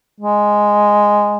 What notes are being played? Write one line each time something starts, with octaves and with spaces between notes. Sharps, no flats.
G#3